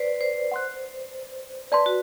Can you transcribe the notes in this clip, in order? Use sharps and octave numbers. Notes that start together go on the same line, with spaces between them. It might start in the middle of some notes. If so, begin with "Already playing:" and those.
Already playing: B4 C5 D5
C5
F#5 C6 F#6
B4 D5 A5 C6
F#4